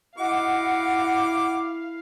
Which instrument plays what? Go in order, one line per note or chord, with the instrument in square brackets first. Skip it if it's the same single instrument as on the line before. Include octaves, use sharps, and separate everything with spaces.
[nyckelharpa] E4 [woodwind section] F#4 D#5 F#5 [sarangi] F5 [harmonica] D6